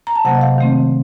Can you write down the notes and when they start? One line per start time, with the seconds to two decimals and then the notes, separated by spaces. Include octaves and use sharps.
0.07 A#5
0.16 A5
0.25 C3 F#3 A#3 F#5
0.35 D#5
0.41 F5
0.58 D#3 A3 C4